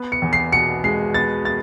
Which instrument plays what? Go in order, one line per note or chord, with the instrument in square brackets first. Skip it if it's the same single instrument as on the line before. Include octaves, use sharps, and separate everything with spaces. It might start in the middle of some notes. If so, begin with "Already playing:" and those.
Already playing: [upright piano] B3
[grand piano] C#7
[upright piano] E2
[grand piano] C7
[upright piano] B2 [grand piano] C#7
[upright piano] G#3 [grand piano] C7
[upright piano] B3 [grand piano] A6
[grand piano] A6